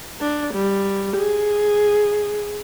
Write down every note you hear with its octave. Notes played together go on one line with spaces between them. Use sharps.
D4
G3
G#4